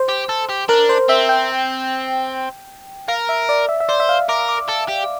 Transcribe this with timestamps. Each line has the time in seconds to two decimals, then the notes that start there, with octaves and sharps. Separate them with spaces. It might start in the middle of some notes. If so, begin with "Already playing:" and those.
Already playing: C5
0.09 G4
0.29 A4
0.49 G4
0.69 D4 A#4
0.89 C5
1.09 C4 E5
1.29 G5
3.08 A#4 F5
3.29 E5
3.49 D5
3.69 E5
3.80 E5
3.89 C5 D5
4.00 E5
4.09 F5
4.29 A#4 D6
4.49 D6
4.69 A4
4.88 G4